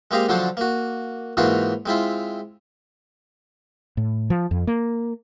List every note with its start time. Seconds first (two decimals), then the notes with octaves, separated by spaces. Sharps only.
0.11 G#3 A#3 C4 G4 D#5 F5
0.29 D3 F3 F#3 D4 A4 C5
0.57 A#3 F#4
1.37 G#2 E3 A#3 D#4 F4 F#4
1.86 G#3 C4 E4 F4
3.97 A2
4.30 F3
4.51 F2
4.67 A#3